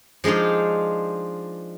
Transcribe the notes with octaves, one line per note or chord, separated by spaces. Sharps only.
F3 G#3 D4 D#4 F4